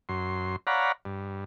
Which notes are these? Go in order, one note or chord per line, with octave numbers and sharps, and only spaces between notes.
F#2 C6
C#5 D5 F5 F#5 A#5 B5
G2